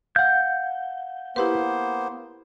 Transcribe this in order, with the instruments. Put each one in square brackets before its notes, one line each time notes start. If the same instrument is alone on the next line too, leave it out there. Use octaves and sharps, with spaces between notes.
[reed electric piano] F5 F#5 [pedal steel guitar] G6
[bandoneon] A#3 B3 C5 [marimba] E4 G4 B4